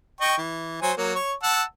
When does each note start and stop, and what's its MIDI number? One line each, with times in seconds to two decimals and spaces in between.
0.21 0.36 75
0.21 0.36 79
0.21 0.36 85
0.38 0.77 52
0.82 0.92 54
0.82 0.92 72
0.82 0.92 80
0.97 1.15 54
0.97 1.15 58
1.16 1.33 73
1.16 1.33 85
1.43 1.63 78
1.43 1.63 81
1.43 1.63 88